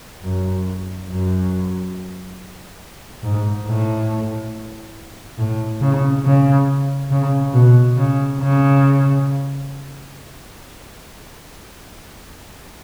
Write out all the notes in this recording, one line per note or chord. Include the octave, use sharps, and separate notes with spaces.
F#2
F#2
G#2
A2
A2
C#3
C#3
C#3
B2
C#3
C#3